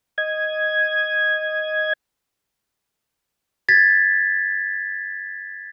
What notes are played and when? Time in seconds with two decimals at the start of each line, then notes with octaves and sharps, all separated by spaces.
0.18 D#5 G#6
3.69 G#6 A6 B6